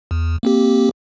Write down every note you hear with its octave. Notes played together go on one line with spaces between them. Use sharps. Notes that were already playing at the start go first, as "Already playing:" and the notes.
E2
A#3 C4 G4